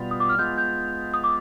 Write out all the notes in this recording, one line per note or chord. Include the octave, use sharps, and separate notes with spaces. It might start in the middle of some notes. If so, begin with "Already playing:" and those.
Already playing: B2 G3 B3 F4
D#6
D6
F6
G#3 B3 F4 G6
G6
D#6
D6